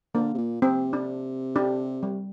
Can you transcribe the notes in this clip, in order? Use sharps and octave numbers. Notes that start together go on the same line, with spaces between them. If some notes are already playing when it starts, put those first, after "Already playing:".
D3 A#3
C3
A#2
C3 C4
D4
D4 G4
G3